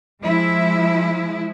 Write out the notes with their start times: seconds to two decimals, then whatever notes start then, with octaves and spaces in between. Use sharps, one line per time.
0.23 F3 G#3 E4